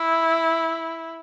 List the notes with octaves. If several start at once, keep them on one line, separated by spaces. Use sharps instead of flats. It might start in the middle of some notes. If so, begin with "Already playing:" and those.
Already playing: E4